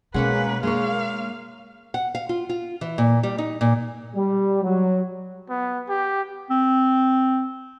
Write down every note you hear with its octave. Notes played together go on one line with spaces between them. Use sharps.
B2 G#3 A#3 C#4 B4 F#5
G#3 A#3 D4 C#5 F5
F#5
F5
F4
F4
E3
A#2
G3
D#4
A#2
G3
F#3
B3
G4
C4